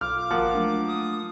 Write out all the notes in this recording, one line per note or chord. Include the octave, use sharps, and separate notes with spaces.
B1 F4 D6 F6
G#1 F3 A#3 F#5 A#5
F#3 A3 D4
D#6